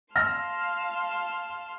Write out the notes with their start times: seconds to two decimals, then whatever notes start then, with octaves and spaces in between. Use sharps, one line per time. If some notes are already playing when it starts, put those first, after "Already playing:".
0.16 F5 A5 C6 F6 A#6